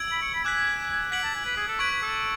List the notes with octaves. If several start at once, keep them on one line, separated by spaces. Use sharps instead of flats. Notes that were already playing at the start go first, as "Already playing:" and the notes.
Already playing: E6 G#6 D7 F#7
B5
C#6
B5
G#5 D6 F#6 B6
F#5 G#6 B6 D7 F#7
A5
G#5
B4
G#4
A4
B4 C#6 G#6 D7 F#7
B4
A4